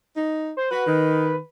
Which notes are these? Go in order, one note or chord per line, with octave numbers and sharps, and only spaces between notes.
D#4
C5
F#4 B4
D#3